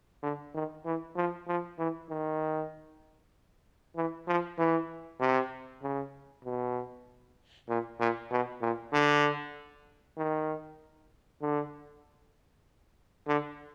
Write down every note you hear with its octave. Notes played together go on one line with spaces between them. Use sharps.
D3
D#3
E3
F3
F3
E3
D#3
E3
F3
E3
C3
C#3
B2
A#2
A#2
B2
A#2
D3
D#3
D3
D3